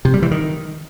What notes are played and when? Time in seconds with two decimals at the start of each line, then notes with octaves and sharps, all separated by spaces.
0.05 C3
0.14 G3
0.22 E3
0.31 D#3